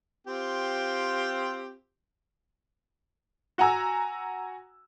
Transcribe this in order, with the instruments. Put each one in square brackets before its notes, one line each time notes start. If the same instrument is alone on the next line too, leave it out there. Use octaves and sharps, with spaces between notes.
[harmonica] C4 F4 G4
[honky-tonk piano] F#4 F#5 G#5 A#5 E6